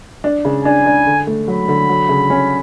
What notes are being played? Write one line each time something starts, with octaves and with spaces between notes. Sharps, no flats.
D4
C#3
D4 G#5
D4
D3
A3
F#3 B5
D3
F#3
C#3
C#4